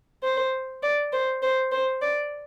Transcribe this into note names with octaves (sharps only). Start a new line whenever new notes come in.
C5
D5
C5
C5
C5
D5